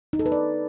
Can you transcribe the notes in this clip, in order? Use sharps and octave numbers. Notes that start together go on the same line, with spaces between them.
D#4
A4
B4
D5